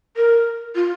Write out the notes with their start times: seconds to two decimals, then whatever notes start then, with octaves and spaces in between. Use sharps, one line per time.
0.17 A#4
0.75 F4